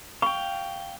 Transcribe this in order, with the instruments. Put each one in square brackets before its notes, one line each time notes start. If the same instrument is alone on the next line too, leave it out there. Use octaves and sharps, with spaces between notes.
[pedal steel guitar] F5 G5 [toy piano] C#6